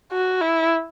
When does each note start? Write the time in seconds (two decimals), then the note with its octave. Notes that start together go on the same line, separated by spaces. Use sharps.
0.12 F#4
0.41 E4